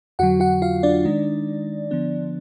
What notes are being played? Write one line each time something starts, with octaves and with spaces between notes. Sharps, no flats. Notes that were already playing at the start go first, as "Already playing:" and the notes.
F2 D3 F#3 F#4 F#5
F#4 F#5
F4 F5
D4 D5
D#3 G#3 D#4
D3 F3 B3 D4